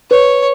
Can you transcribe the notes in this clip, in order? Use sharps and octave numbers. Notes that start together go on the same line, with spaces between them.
B4 C#5